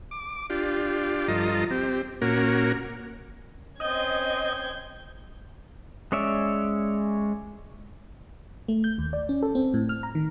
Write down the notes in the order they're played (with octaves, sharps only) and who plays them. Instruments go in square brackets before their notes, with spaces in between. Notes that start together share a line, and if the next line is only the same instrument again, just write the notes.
[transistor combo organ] D6
D4 F4 G4
G2 F3 F4 A4 D#5 A#5
C4 G4
A#2 A#3 C#4 F#4 A#4
[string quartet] C4 C#4 [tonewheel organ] D#5 [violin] G6 G#6
[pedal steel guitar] G#3 C#4 C#5 D5 E5
[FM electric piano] A3
G6
D#2
D5
C#4
A4
C4
A2
F6
A#5
D#3